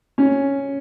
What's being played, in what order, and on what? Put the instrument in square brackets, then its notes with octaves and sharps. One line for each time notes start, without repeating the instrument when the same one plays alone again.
[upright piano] C#4